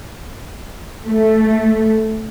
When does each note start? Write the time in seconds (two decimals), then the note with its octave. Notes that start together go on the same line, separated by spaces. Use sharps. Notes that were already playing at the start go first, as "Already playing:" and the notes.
1.06 A3